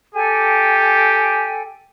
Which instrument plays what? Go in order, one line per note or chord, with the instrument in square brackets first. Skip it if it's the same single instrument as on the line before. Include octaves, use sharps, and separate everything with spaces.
[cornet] G4 [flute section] A4 G5 G#5